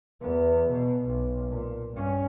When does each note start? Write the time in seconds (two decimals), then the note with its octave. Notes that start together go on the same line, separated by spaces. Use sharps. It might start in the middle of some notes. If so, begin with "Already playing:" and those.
0.21 E2 B3
0.70 B2
1.06 B1
1.50 A#2
1.94 G2 C#4